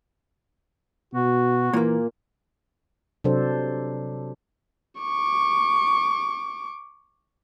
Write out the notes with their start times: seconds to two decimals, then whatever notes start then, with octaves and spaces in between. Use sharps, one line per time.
1.14 B2 F#4
1.73 A#2 E3 A#3
3.24 C3 F#3 D4 A4 C5
4.99 C#6 D6